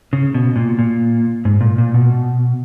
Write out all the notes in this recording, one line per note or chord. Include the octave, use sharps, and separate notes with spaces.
C#3
B2
A#2
A#2
G#2
A#2
A#2
B2